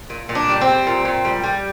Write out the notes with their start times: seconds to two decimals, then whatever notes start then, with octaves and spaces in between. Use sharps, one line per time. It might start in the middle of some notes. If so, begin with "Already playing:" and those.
0.10 A#2
0.29 A#2
0.35 D4
0.48 G3
0.61 C4
0.67 G3
0.87 A#2
1.05 A#2
1.25 G3
1.44 G3